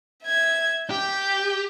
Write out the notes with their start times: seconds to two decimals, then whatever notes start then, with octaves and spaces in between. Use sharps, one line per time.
0.23 E5 G#6
0.90 G4 G6